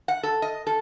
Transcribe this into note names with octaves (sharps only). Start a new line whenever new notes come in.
F#5
A4
D#5
A4